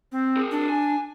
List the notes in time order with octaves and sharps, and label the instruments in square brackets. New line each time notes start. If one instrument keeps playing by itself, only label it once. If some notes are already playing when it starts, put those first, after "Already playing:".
[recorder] C4
[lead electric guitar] G#4 A#4
[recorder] D4
[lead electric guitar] G#5